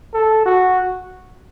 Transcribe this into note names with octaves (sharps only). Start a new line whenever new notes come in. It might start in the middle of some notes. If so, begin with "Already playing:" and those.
A4
F#4